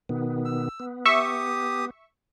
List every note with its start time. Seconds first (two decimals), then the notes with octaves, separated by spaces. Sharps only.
0.09 B2 D#3 B3
0.45 E6
0.80 B3
1.05 G4 E5 C#6 D#6